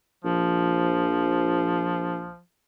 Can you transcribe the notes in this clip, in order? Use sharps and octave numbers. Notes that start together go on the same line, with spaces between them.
A#1 F3